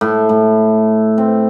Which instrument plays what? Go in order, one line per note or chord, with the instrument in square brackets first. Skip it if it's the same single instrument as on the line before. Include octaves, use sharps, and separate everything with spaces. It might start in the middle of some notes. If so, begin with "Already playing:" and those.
[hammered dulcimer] A2
A2
C4